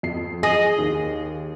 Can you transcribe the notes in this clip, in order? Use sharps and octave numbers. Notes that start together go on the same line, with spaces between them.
F2 C7
G#4 D#5
D#2